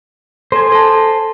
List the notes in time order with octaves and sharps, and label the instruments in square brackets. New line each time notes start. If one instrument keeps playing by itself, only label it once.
[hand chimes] A4 [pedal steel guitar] C5 G#5
[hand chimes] A4 A5